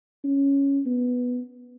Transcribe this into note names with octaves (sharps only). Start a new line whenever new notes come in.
C#4
B3